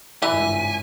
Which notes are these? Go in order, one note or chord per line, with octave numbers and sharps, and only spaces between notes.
G#1 C#2 G2 E3 G#5 B6